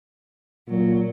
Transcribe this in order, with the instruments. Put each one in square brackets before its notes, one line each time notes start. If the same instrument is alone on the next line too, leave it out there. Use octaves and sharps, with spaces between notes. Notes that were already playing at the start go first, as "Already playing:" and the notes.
[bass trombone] A#2 [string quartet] F#3